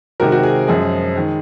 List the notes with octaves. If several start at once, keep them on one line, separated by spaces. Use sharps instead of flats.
C3 D#3 G#3 F#4 A#4
F#4
G#4
F#2 F3 G#3 G#4
D#3 G#3